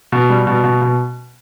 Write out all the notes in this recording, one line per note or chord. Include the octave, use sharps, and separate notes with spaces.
B2
G3
B2
B2
B2